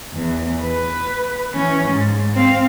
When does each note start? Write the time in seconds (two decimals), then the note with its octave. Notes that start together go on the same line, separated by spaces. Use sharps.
0.14 E2
0.61 B4
1.53 E3 C#4
1.86 G#2
2.33 C4 F5